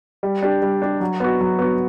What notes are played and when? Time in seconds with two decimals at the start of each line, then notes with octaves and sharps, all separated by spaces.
0.23 G3
0.42 D4 G4
0.62 G3
0.82 D4 G4
1.00 F#3
1.20 B3 F#4
1.40 F#3
1.59 B3 F#4